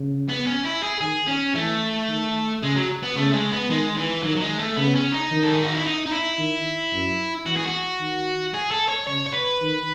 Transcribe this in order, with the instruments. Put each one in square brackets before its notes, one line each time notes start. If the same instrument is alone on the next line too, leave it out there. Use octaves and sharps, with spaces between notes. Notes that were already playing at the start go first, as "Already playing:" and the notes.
Already playing: [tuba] C#3
[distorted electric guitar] B3
C#4
E4
G#4
[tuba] D#3 [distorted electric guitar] G#4
[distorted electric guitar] C#4
[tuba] E3 [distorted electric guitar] A3
[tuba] D#3
[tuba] C#3 [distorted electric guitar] G#3
[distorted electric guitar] F#3
B3
[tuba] C#3 [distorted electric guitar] A3
[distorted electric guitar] G#3
B3
[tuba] D#3 [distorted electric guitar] G#3
[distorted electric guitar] E3
[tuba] D#3 [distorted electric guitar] F#3
[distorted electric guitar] F#3
G#3
A3
[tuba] C#3 [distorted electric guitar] B3
[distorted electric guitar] C#4
D#4
[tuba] D#3
[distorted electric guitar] A4
G#4
F#4
E4
D#4
D#4
E4
[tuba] D#3
F#2
[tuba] E3 [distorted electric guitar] F#4
[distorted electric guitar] G#4
F#4
[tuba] D#3
[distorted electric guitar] G#4
A4
C#5
[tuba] C#3 [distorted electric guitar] C#5
[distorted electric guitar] C#5
B4
[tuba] D#3